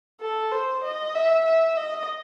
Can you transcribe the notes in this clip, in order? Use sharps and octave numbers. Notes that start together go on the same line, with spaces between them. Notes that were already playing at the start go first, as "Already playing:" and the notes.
A4
C5
D#5
E5
E5
D#5